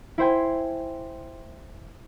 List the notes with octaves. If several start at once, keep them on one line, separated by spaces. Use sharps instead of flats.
E4 C5 G5 G#5